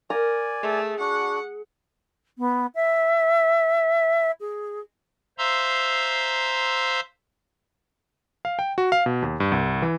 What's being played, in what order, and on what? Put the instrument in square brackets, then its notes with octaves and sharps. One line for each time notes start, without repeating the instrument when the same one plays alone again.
[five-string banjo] A#4 [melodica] D5 G#5
[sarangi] A3 [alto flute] G#4
[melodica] D4 F#4 [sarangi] F#5
[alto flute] B3
E5
G#4
[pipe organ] C5 E5 F5 A#5 C6 E6
[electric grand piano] F5
G5
F#4
F5
B2
D#2
G2
C2
E3